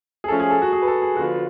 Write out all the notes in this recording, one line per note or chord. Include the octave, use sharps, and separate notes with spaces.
G#4
F3 A3 C#4 A4
G#4
A4
F#4
G#4
B4
A4
G#4
D3 F3 B3 F4 F#4